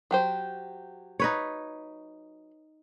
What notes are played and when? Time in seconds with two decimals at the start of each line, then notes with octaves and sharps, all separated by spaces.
0.11 F#3 G4 C5
1.20 D#4 B4 C#5